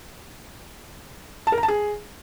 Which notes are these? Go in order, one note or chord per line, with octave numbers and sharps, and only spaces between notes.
A5
A#4
A#5
A5
G#4